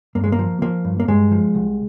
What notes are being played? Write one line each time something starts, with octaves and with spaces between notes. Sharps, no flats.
G2 A#3
G#3
A#3
F3
F3 A#3
G2
A#3
G2 G#3
F3
C2